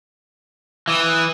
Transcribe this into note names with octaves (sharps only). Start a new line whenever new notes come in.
E3 D#6 E6